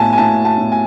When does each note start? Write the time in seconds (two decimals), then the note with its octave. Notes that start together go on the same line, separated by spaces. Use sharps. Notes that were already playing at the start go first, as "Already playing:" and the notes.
Already playing: A2 B3 G#5 A5
0.13 G#5
0.18 A2 A5
0.45 A5
0.58 A2
0.72 G#5